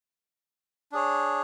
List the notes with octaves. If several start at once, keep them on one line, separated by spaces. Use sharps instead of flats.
D4 G#4 C#5